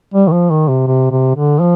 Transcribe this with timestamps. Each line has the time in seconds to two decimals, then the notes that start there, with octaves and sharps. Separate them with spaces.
0.14 G3
0.28 D#3
0.32 F3
0.50 D#3
0.69 C3
0.87 C3
1.11 C3
1.36 D3
1.60 F3